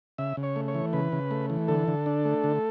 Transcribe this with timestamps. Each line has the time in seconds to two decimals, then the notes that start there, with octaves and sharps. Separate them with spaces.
0.18 C#3 E5
0.37 C#3
0.43 C#5
0.56 A3
0.68 C#5
0.75 E3
0.93 C#3 B4
1.12 C#3
1.31 A3
1.50 E3
1.68 D3 A4
1.88 D3
2.06 D4
2.25 A3
2.44 D3